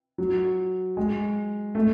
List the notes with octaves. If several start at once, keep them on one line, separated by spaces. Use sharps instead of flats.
F#3
G#3
A3